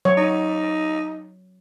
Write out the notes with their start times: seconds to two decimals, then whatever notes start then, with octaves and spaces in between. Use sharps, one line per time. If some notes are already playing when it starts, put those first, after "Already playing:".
0.05 F#3 C#5
0.18 D#4